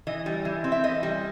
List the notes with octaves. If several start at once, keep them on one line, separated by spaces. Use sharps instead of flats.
E3 D#5
G3
E3
C4
E5
E3 D#5
G3